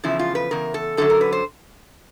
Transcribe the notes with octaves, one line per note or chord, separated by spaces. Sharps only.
E2 C#3 F3 E4
F4
B4
E2 C#3 A#4
A4
F#2 D3 F#3 A4
A#4
B4
C5